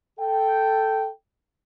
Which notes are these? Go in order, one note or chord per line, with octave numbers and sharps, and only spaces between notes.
A4 G5